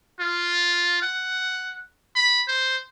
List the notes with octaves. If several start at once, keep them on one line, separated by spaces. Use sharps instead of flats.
F4
F#5
B5
C5